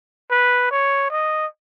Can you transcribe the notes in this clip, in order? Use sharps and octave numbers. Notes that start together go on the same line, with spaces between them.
B4
C#5
D#5